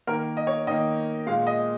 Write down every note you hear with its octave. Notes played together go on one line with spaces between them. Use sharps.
D#3 A#3 A#4
D#5
C#5
D#3 A#3 D#5
A#2 G#3 F5
D#5